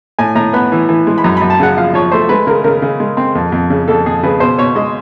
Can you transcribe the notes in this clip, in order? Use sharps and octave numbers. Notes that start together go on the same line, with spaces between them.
A2 G#5
A2 A#5
B3 B5
E3
E3
G#3
B5
F#2 A#5
F#2 B5
A5
C#3 F#5
F3 F5
F3 C#5
A3 C5
G#3 B4
C#3 A#4
C#3 A#4
C#3
G#3
C4
F2
F2
C#3
F2 A4
F2 G#4
C#3 B4
B2 C5
B2 C#5
G#3 D#5